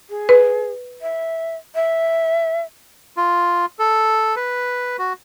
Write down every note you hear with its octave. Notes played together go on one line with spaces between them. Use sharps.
G#4
B4
E5
E5
F4
A4
B4
F#4